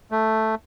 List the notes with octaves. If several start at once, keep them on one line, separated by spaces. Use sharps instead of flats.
A3